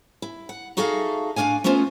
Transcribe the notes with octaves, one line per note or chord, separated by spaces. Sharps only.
E4
F#5
D#4 F#4 G#4 A4 E5 F5
A2 B3 D4 F5 G#5
A3 B3 C#4 F4 C5